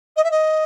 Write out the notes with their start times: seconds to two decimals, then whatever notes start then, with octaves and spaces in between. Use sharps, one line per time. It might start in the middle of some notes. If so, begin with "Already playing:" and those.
0.16 D#5
0.24 E5
0.31 D#5